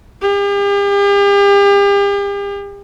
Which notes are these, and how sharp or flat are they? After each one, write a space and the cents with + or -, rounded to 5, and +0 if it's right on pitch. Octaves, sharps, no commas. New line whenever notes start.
G4 +40